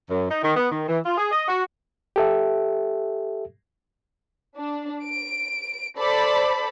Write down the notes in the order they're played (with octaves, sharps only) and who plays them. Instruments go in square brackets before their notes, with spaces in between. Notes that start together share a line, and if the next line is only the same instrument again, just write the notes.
[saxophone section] F#2
D#4
D#3
B3
D#3
E3
F4
G#4
D#5
F#4
[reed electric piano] G4 A4 E5
[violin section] D4
D7
A4 C5 D5 B5